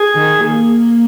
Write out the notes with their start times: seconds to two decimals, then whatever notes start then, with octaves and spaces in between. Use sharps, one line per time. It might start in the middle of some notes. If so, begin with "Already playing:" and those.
Already playing: G#4
0.15 D#3
0.47 A#3